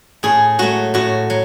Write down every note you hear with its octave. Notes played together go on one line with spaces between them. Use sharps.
A2 G#4
F#3 A3 F#4
A2 F#4
F#3